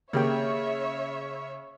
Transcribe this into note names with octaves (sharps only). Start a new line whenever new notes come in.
C#3 A#3 G4 C#5 E5 G5